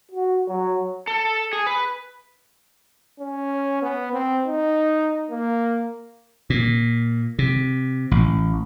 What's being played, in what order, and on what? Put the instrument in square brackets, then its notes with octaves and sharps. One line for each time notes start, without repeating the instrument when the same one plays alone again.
[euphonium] F#4
F#3
[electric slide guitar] A4
G#4
B4
[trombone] C#4
B3
C4
D#4
A#3
[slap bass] A#2
C3
A1